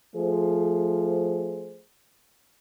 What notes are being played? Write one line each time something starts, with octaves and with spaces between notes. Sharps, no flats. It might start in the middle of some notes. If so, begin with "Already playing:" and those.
F3 A3 G#4 C5